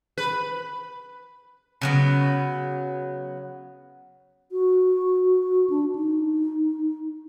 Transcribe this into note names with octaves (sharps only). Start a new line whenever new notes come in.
B4
C#3 F#3 B3
F#4
D4
D#4